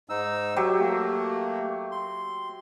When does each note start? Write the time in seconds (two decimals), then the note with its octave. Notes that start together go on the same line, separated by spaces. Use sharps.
0.09 G#2 D#4 E6
0.56 F#3 G4 E5
0.80 A3 A#3
1.92 C6